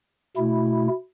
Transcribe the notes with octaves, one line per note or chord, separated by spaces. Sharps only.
B2 A3 E4